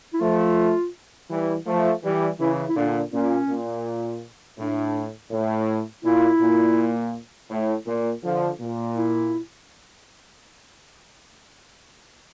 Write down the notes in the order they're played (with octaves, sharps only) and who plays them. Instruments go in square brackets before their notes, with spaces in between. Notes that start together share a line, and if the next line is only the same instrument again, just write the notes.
[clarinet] E4
[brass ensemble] F3 A3 [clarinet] F4
[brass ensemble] E3 G3
F3 A3
E3 G3
[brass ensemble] C#3 E3 [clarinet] E4
[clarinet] E4
[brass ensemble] A#2 D3 [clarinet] D4
[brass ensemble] A#2 [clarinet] C#4
[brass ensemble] A#2
[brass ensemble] A2 [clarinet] D4
[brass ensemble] A2
[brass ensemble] A#2 [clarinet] E4
[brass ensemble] A#2
A2
A#2
D3 F3
A#2
[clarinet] E4